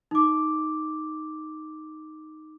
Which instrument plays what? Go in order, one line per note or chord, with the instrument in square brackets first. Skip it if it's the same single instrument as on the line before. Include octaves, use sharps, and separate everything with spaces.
[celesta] D#4 D6